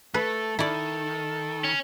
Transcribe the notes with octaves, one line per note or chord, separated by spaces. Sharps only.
A3 A4 B4
D#3 E4 A4 D5
C#4